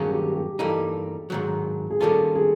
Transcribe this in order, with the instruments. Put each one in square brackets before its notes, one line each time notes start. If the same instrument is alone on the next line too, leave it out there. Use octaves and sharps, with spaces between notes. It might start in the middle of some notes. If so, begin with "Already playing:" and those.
Already playing: [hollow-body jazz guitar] G2 D#3 F#3 A#3 C#4 [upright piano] G#4
[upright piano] G4
G4
[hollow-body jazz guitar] G2 E3 G3 A#3 D#4 [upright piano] A4
[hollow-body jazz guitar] G#2 D#3 F#3
[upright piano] G#4
[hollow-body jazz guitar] D#3 G3 A#3 C#4 F4 [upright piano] A4
[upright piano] G#4